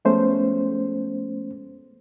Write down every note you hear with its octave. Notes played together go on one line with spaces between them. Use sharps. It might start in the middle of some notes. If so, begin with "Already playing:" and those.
F3 G#3 A3 B3 C#4 C5